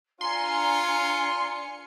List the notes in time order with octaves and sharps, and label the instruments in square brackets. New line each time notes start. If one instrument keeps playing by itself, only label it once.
[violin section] D4 G#5 C#7 [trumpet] F4 [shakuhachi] A#5 [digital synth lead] C6